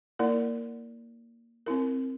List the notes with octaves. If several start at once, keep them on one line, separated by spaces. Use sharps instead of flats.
A#3 E4 A#4 D5
C4 E4 A#4